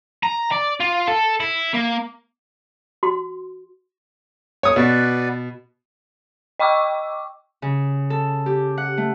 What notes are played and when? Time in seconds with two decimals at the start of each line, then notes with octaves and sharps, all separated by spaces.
0.23 A#5
0.52 D5
0.80 F4
1.07 A4
1.40 E4
1.74 A#3
3.03 F#4 C6
4.63 C#5 D#6
4.76 B2 F#4 B4 D5
6.59 D#5 G5 C#6 D6 E6
7.62 C#3
8.10 A4
8.46 G4
8.78 F#5
8.97 A3